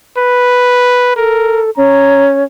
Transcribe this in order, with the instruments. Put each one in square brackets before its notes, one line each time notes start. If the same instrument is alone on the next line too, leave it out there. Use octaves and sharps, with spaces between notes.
[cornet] B4
[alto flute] A4 [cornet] A#4
[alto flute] C#4 [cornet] A#5